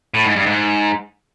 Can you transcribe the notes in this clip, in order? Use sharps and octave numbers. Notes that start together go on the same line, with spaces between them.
A2
G#2
G2
G#2